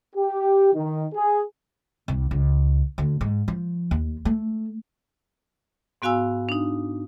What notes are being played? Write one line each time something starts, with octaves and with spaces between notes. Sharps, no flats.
G4
D#3
G#4
C2
C#2
D2
G#2
F3
D#2
A3
G#2 B3 F#4 F5 G#5 E6
D4 D#4